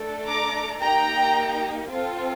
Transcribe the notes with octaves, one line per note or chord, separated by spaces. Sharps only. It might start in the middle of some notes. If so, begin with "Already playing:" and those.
Already playing: A3 D4 A4
A#5 D6
A#3 D#4 G4 G5 A#5
C4 F4 A4